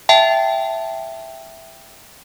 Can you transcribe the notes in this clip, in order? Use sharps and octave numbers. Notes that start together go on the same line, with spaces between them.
E5 G5 A5